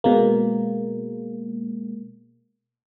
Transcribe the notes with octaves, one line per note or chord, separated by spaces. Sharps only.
B2 G#3 A#3